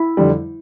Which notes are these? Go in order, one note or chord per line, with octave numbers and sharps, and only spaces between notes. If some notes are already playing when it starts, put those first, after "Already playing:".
Already playing: E4
F2 D3 G3